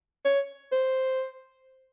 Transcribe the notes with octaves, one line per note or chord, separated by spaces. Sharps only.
C#5
C5